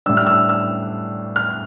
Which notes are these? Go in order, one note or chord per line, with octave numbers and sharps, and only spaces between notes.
A2 G3 D4 E6
F6
E6
E6
F6